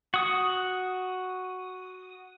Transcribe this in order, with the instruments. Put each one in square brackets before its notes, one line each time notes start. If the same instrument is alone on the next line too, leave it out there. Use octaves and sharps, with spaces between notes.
[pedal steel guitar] F#4 D#6